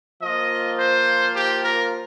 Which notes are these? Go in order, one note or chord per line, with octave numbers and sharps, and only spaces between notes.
F3 A#3 F4 D#5
C5
G4
A#4